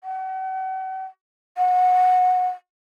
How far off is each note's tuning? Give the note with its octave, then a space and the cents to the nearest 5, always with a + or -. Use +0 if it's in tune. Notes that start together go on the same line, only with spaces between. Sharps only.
F#5 +40
F#5 -20